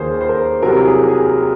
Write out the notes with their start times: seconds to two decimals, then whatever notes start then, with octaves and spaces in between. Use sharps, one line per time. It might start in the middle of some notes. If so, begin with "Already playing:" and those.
Already playing: D#2 D#3 A#3 F4 G#4 C5 C#5
0.21 C5
0.29 A#4
0.62 C2 C3 F#3 A#4
0.85 G#4
1.09 G#4